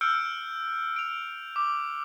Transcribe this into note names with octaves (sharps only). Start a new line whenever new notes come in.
E6 F6 G6 C#7 D7
D7 F7
D6